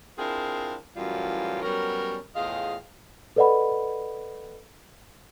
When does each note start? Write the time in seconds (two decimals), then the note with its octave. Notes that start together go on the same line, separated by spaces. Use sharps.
0.18 C4 D4 E4 F4 G#4 A#4
0.96 F#2 A2 E3 G3 F4
1.62 F#3 G3 B3 C#4 A#4
2.35 E2 A2 F4 G#4 D#5 F5
3.36 A4 B4 D5 D#5 F#5 B5